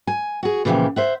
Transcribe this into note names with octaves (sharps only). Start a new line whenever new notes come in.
G#5
F#4 G#4
A#2 C#3 E3 F3 B3 G4
C5 E5 F#5